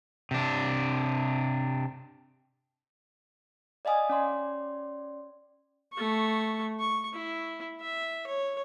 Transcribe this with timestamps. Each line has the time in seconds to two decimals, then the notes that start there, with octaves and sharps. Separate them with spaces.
0.31 C3 D4
3.85 D5 D#5 F5 G#5 D#6
4.09 C#4 D5 C6
5.93 A3 C#6
6.80 C#6
7.13 E4
7.80 E5
8.27 C#5